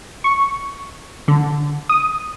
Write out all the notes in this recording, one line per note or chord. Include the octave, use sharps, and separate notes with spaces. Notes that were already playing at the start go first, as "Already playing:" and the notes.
C#6
D3
D#6